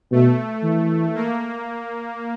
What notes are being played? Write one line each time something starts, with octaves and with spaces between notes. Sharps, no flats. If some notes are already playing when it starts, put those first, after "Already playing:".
B2 A3
E3
A#3